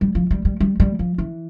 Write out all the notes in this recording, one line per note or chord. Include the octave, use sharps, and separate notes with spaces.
G3
F3
G3
G3
G3
G3
F3
E3